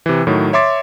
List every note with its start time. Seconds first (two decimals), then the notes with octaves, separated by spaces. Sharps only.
0.06 C3 E3
0.27 A2 D#3 F#3
0.53 C#5 E5 C6 D6 A6